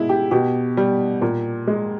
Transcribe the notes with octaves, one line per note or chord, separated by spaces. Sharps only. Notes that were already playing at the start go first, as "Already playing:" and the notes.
Already playing: B2 G#3 E4
G4
B2 G4
G3
A#2
G#3